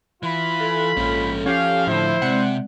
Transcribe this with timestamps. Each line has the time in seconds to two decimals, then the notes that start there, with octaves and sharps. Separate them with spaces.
0.23 E3 F4 B5
0.60 A4
0.97 A#1 G#2 C#4
1.46 F3 C#4 G4 F5
1.87 A2 D3 E4 C5 E5
2.22 C3 G#3 C4 D5 F#5